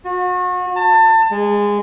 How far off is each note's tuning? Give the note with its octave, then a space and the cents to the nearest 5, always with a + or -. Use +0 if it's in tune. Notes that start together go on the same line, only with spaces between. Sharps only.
F#4 -35
A5 +25
G#3 -15